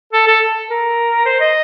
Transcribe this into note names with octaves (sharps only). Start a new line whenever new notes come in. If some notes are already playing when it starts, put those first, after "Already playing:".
A4
A4
A#4
C5
D#5